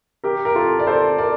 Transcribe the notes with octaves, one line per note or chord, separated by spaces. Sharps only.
G4 A#4
A#4
F4 A4
D5
A4 C5
A#4 D5